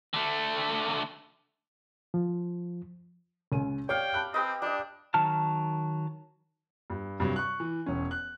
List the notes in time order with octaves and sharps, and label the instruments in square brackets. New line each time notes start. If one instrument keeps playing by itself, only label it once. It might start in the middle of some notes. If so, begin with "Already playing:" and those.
[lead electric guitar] D3 A3
[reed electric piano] F3
[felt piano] C#2 C#4 D#7
[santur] G4 F5 [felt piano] C#5 D5 [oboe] G5
[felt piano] A5 B5 F#6
[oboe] C4 [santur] G4 B4 D#5
[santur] G3 D#5 [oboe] D4
[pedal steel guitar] D#3 F#3 A5 F6
[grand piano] G2
G2 C3 F#3
C#6 F#6
E3
E1 C#4
F#6